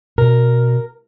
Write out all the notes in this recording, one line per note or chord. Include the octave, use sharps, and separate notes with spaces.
B2 A#4